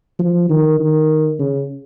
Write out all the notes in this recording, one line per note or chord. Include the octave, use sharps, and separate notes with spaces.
F3
D#3
D#3
C#3